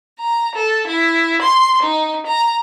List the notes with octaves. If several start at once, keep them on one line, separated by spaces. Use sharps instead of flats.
A#5
A4
E4
C6
D#4
A#5